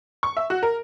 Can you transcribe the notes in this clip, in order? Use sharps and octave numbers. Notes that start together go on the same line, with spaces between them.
C#6
E5
F#4
A#4